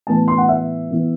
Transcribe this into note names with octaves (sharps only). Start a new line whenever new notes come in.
A2 E3 B3 A5
C6
F#5
E5
E3 B3